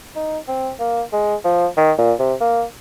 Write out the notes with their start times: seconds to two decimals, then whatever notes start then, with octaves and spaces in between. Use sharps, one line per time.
0.16 D#4
0.48 C4
0.80 A#3
1.13 G#3
1.44 F3
1.77 D#3
1.98 A#2
2.19 C3
2.41 A#3